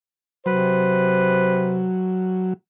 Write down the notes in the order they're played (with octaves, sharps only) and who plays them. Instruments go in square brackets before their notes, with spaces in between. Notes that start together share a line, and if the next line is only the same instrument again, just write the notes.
[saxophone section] C3 B4 C5 [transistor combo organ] F#3